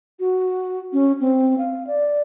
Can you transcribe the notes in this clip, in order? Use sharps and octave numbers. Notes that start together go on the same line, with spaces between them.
F#4
C#4
C4
F5
D5